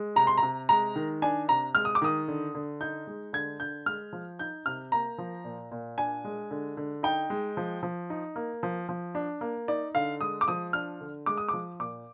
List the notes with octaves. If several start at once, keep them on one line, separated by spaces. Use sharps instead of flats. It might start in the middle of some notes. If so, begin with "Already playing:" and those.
Already playing: G#3
C3 A#5
C6
A#5
C3
G#3 A#5
D#3
D4 G#5
C3 A#5
G#3 F6
D#6
D6
D#3 D#6
D3
D3
D#4 G6
G#3
D3 G#6
D3 G6
G#3 F6
F3
D#4 G6
C3 F6
A#3 A#5
F3
A#2
A#2
D4 G#5
G#3
D3
D3
D#4 G5
G#3
F3
F3
D#4
A#3
F3
F3
D4
A#3
D#4 D5
D3 F5
G#3 D#6
D6
F3 D#6
D4 F6
D3
G#3 D6
D#6
F3 D6
A#2 D6